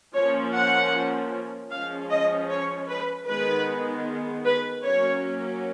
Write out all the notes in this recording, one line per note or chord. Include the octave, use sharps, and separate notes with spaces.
F3 A#3 C#4 C#5
F#5
F3 G#3 C#4 F5
D#5
C#5
B4
D#3 G#3 B3 B4
B4
F#3 A#3 C#4 C#5